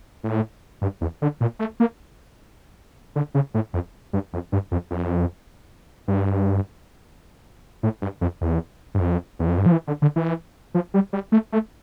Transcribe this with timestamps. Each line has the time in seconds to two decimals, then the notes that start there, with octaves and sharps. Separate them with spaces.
0.23 A2
0.82 G2
1.01 E2
1.22 D3
1.41 A#2
1.59 A3
1.80 A#3
3.16 D3
3.34 C#3
3.54 A2
3.73 F2
4.13 G2
4.33 F2
4.52 G2
4.71 F2
4.91 F2
6.08 G2
7.83 A2
8.02 G2
8.21 F2
8.41 E2
8.94 G2
9.00 F2
9.39 E2
9.48 F2
9.58 G2
9.66 F3
9.72 E3
9.87 D3
10.02 D3
10.16 E3
10.74 F3
10.94 G3
11.13 G3
11.32 A3
11.52 A3